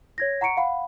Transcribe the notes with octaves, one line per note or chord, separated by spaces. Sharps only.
C#5 G#6 A#6
F#5 A#5 C#6 C#7 D7
F5 F#5 B5